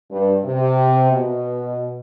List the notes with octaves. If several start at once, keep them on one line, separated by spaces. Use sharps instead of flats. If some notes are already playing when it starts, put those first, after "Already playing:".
G2
C3
B2